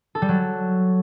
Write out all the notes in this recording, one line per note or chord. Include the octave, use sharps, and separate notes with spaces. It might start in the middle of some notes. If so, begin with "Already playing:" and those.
A4
G3
F#3